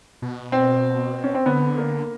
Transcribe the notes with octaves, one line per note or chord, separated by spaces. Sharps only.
B2
C4
C#4
C4
D3 B3
A#3